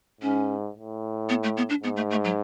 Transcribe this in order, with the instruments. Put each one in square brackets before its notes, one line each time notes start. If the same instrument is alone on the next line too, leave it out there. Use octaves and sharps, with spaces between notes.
[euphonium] G#2 [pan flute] C#4
[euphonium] A2
[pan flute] B3
A3
B3
D4
[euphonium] G#2 [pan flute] B3
[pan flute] A3
A3
F#3